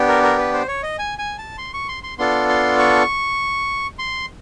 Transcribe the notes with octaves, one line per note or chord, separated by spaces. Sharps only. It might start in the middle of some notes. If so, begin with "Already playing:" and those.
Already playing: B3 D4 G4
A#4
A#4
B4
C5
C#5
D#5
G#5
G#5
A5
C6
C#6
C6
C6
B3 D4 F4 A4 C6
C6
C#6
C6